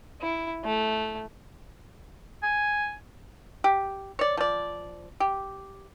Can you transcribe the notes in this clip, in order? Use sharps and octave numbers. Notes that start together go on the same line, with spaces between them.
E4
A3
G#5
G4
C#5 D5
F3 D5
G4